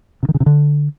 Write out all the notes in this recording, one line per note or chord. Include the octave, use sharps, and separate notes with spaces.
C3
D#3
C#3
C3
D3